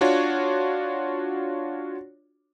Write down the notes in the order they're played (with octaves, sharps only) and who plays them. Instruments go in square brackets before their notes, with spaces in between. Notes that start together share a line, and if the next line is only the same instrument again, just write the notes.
[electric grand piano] D4 F4 F#4 C#5